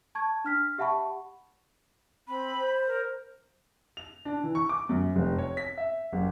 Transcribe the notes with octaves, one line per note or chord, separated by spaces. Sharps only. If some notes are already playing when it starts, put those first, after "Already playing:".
A5 C#6 G#6
D4 F6 B6
G4 E5 F#5 A5 B5 C#6
C4 B5
C5
A#4
F7
D4
E3
C#6
D6
F#2
F1
C#5
B6
E5
F#1